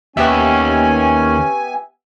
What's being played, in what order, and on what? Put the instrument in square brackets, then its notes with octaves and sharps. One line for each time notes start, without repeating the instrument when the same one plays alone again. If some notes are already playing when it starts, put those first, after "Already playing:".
[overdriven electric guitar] D#2 [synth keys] B3 G4 E5 [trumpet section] C#4 [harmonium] G#5